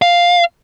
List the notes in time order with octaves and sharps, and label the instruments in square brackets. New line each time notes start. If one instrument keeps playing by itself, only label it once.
[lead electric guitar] F5